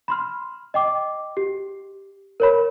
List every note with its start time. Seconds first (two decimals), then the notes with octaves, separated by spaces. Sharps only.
0.08 B5 C6 F6
0.74 D#5 G5 D6
1.37 G4
2.40 A#4 C#5 B5